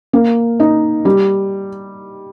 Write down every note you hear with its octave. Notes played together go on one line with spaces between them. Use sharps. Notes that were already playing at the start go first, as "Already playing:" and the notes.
A#3
D#4
G3